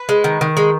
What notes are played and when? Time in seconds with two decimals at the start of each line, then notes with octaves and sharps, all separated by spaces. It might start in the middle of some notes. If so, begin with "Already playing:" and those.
Already playing: B4
0.09 G#3
0.24 D#3
0.41 D#3
0.57 G#3